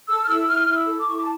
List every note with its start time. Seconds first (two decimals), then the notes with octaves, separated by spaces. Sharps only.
0.08 A4 E6
0.24 F6
0.28 E4 E6
0.48 E4 F6
0.67 E4
0.74 E6
0.87 A4
1.00 D6
1.07 E4 C#6
1.16 D6
1.22 A5